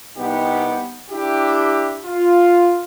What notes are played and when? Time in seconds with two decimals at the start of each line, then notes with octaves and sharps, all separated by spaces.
0.17 C2 B3 D#4 G4
1.11 D4 E4 G4
2.04 F4